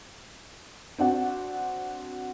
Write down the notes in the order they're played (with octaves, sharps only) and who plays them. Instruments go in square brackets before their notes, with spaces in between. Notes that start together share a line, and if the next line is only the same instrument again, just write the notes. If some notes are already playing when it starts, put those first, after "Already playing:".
[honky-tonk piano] C4 D4 F#4